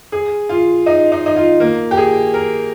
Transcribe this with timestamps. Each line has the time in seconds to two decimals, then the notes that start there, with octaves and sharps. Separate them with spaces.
0.12 G#4
0.49 F4
0.86 D#4
1.12 D#4
1.26 D#4
1.36 F4
1.60 A#3
1.91 G4
1.97 G#4
2.34 A#4